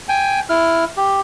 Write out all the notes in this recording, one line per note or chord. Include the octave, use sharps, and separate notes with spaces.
G5 G#5
E4 F6
G4